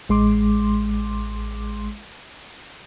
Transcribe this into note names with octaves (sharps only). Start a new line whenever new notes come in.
A1 G#3 C6 D6